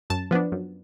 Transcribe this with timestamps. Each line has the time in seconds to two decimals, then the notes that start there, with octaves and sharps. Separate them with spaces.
0.10 F#2 A5
0.31 F3 B3 D4
0.52 F#2